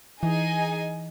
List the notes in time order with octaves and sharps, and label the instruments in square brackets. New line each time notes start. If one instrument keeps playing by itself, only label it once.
[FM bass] E3 [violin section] D#4 G#4 D#5 G#5